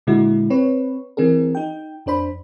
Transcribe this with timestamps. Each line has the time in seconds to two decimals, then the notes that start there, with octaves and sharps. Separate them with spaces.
0.07 A#2 D3 G#3 E4 F#4
0.50 C4 B4 C#5
1.17 E3 C4 G#4 A#4
1.55 D#4 G5
2.06 F2 D4 C5 B5